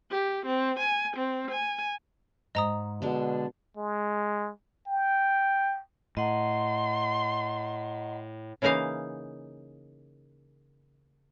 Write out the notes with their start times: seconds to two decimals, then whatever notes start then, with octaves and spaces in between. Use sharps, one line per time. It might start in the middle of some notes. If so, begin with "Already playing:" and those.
0.11 G4
0.46 C4
0.79 G#5
1.17 C4
1.51 G#5
2.55 G#2 D#5 A#5 D#6
3.02 B2 D3 G#3 D4
3.77 G#3
4.87 G5
6.17 A2 D#5 F#5 A#5 C6
8.62 C#3 E3 A#3 D#4 F5